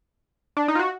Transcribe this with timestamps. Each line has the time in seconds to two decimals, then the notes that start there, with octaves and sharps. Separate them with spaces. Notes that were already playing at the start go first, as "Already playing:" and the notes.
0.57 D4
0.68 D#4
0.75 F4
0.79 F#4